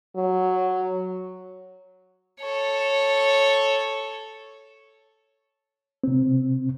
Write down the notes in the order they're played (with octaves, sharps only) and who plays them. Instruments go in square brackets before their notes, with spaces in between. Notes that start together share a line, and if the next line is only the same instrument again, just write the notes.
[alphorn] F#3
[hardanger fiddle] A4 C#5
[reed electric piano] C3 C4